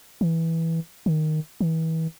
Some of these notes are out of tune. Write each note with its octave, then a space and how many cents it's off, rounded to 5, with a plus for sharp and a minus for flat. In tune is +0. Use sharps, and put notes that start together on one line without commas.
E3 -10
D#3 -5
E3 -35